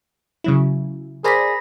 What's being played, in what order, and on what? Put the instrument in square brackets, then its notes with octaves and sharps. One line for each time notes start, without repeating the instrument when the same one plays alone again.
[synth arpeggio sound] C#3 F#3 E4
[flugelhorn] G#4 [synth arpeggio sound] A#4 C5 D5 [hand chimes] B5 A#6 B6